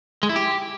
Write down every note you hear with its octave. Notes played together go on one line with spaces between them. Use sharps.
G#3
E4
G4